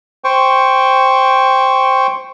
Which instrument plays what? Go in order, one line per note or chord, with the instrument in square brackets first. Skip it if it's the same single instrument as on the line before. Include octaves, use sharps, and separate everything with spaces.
[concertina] C5 G5 C#6